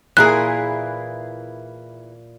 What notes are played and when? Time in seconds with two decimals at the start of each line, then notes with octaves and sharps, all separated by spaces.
0.17 A#2 E3 E4 G#4 A#4 F#6